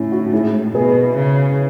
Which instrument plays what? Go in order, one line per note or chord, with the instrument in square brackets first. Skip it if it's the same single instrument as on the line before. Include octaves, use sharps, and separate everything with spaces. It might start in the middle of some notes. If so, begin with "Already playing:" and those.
Already playing: [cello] A2 [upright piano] C#4 D#4 E4
[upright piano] D#4 F#4
E4 G#4
[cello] B2 [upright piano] G#4 B4
[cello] C#3